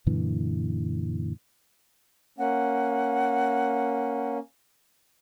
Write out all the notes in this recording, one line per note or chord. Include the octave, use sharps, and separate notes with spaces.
F#2 A#2 D3 E3
A#3 C#4 F#5